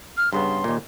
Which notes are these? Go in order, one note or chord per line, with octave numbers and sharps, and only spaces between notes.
F6
G2 C#3 B3 C6
D#2 A#2